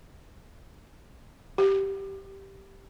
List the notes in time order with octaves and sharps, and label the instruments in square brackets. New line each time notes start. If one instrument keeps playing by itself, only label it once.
[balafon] G4